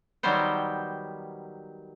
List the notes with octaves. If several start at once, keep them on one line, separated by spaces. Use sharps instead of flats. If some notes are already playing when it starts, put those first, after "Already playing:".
D#3 F#3 G3 B3 C5 G5